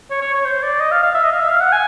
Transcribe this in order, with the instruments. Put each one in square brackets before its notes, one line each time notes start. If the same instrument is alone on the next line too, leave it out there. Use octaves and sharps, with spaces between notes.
[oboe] C#5
C#5
C#5
C5
D5
D#5
F5
F5
E5
D#5
F5
E5
F5
F#5
G#5